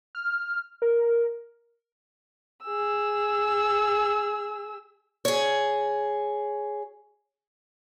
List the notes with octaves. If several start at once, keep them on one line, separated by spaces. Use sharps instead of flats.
F6
A#4
G#4 E6
G#4 C#5